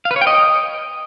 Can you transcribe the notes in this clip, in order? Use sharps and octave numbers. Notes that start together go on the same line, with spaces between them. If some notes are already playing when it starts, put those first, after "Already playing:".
F5
B4
C#5
G5
D#5